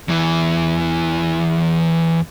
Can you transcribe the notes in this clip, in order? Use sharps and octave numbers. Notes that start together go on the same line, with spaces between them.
E2 E3